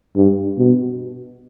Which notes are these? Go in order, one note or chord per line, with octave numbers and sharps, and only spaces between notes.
G2
B2